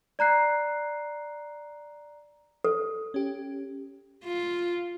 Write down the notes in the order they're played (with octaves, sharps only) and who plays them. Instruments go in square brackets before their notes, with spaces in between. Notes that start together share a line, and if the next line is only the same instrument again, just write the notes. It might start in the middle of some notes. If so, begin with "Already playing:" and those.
[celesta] D5 A#5 F#6 C7
[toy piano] A4
[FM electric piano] C#4 G4
[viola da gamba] F4